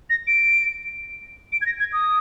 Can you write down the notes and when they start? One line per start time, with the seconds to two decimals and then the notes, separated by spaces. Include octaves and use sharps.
0.10 A#6
0.27 D7
1.52 D7
1.61 G#6
1.66 A#6
1.80 G#6
1.93 D#6